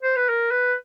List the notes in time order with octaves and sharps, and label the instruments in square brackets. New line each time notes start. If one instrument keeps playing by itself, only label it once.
[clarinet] C5
B4
A#4
B4